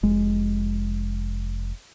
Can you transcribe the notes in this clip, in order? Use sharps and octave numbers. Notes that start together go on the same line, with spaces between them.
F1 G#3